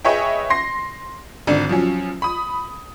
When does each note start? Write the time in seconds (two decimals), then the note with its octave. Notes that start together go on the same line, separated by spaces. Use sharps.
0.05 G#4 B4 C#5 D#5 E5 G5
0.50 C6 A#6 C7
1.47 G#1 D3 D4
1.69 F3 F#3 C#4
2.22 B5 D#6